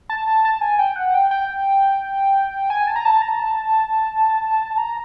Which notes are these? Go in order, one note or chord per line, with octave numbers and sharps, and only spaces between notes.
A5
A5
A5
G#5
G5
F#5
G5
G5
G#5
A5
A#5
A5
A#5
A5
A#5